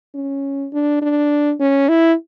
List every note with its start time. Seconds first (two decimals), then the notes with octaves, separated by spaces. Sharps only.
0.15 C#4
0.73 D4
1.01 D4
1.60 C#4
1.89 E4